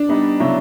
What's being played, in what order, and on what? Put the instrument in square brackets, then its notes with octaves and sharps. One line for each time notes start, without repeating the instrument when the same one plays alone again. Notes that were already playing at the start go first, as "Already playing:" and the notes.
Already playing: [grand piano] D4
[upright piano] G3 B3 D#4
C#3 F#3 B3 E4